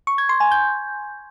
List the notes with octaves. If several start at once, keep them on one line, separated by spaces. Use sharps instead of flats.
C#6
G#6
C6
G#5
G6